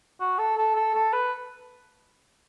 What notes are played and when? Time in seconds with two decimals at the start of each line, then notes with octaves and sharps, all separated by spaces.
0.20 F#4
0.38 A4
0.57 A4
0.75 A4
0.94 A4
1.13 B4